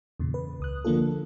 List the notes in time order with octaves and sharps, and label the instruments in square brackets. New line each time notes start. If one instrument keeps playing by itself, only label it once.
[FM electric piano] E2 A#2 C#3
B4
C#2 D#6 F#6
D3 F3 A#3 D4 F4 A4